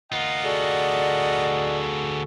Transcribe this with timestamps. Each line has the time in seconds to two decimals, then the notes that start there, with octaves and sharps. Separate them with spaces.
0.12 D2 F4 A#4 D#5 F#5
0.44 F#4 G#4 A4 D5